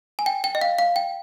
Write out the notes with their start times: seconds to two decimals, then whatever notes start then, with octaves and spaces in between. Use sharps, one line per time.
0.19 G#5
0.26 G5
0.44 G5
0.55 D#5
0.61 F5
0.79 F5
0.96 G5